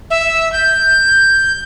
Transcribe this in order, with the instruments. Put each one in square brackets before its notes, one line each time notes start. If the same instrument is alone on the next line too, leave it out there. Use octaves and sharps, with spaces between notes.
[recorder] E5
G6